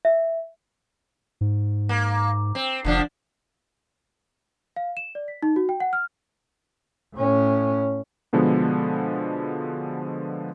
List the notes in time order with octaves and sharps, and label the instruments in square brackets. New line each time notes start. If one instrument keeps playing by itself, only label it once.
[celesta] E5
[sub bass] G#2
[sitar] A#3
C4
[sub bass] F1 [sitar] D3 F3 D4
[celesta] F5
E7
D5
B6
D#4
F#4
G5
F#5
F6
[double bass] A2 C#4
[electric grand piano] B2 D3 F3 G#3 B3